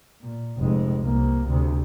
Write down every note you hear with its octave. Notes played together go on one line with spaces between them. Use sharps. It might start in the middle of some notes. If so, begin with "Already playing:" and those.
A#2
F1 G#3
C2 A#3
D2 C3